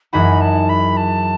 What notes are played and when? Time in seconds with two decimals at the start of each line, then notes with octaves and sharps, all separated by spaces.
0.13 F#2 E3 G#3 D#4 F#4 B5
0.41 A5
0.69 B5
0.97 A5